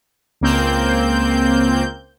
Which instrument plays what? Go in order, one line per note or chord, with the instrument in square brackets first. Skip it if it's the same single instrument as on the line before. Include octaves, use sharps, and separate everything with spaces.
[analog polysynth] C#2 A#3 C4 G6